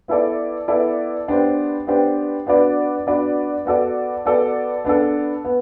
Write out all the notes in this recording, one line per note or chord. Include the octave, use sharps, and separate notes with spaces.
B3 E4 A4 D5
B3 E4 A4 D5
B3 D4 G4 C5
B3 D4 G4 C5
B3 D4 F#4 B4 D5
B3 D4 F#4 B4 D5
B3 F#4 A4 D5
B3 F#4 A4 D5
B3 D4 A4
B3